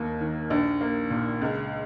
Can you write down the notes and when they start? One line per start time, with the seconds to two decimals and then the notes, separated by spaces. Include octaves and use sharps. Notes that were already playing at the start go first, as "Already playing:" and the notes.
Already playing: D#2 A#3
0.20 D#3
0.50 A#1
0.81 A#3
1.10 A#2
1.41 C#2